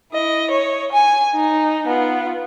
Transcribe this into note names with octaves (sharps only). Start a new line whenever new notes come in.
E4 D#5
C#5
G#5
D#4
B3 F4